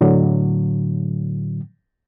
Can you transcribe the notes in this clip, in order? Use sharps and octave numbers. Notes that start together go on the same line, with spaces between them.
A2 D3 F#3